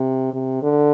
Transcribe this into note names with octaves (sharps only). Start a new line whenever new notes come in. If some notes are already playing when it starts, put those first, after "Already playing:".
Already playing: C3
C3
D3